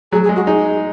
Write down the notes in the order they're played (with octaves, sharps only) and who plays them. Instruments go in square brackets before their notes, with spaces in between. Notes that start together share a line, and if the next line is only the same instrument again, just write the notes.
[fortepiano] F#3 [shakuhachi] G#4
[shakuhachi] G#4
[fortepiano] G#3
[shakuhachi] F#4
[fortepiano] D#4 [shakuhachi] G#4